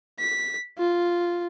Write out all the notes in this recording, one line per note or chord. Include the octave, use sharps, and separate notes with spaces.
B6
F4